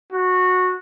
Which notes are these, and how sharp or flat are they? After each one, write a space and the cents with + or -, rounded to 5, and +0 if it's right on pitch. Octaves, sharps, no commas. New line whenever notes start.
F#4 -15